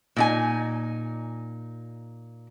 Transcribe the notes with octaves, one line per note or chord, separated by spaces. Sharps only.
A#2 D#4 G#5